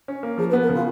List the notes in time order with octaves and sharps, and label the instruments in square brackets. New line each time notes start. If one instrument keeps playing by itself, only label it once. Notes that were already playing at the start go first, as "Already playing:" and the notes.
[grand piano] C#4
A#3
[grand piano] F3 [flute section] G#4
[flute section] B4
[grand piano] B3
[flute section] A#4
[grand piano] C#3 [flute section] F4